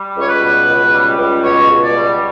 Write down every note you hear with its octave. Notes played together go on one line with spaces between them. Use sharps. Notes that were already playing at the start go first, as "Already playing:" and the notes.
Already playing: G3
C#2 C#5
B4
B2
C#2
G3
C#2
B2 C#5
C#2
D5
G3